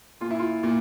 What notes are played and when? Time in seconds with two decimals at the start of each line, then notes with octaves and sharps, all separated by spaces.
0.21 A#2 F4
0.31 E4
0.39 F4
0.63 A#2